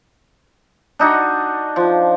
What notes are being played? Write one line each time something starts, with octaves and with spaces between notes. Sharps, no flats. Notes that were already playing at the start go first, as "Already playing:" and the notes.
D4 D#4 F#4
F3